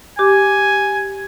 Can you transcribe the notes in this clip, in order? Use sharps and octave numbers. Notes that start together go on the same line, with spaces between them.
G4 G#5 D6